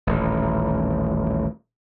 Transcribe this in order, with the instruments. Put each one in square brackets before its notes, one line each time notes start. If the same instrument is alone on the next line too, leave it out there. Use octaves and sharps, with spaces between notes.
[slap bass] D#1 A1